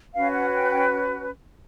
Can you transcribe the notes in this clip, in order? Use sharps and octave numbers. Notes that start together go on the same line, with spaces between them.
C#4 F#4 B4 F5
F#5
G5
G5